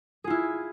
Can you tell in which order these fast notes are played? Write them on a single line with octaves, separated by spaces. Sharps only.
G#4 F4 E4